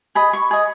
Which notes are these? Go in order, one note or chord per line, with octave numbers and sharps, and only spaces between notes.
G#4 D#5 B5
C#6
G#4 D#5